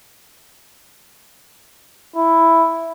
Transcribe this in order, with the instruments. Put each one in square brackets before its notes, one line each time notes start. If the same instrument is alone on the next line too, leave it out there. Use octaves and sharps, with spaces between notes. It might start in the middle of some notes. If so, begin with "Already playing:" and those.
[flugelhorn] E4